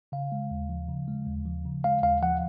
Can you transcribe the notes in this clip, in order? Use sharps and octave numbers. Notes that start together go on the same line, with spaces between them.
C#3 F5
G#3
D#2
F3
C#3
G#3
D#2
F3
C#3
G#3 F5
D#2 F5
F3 F#5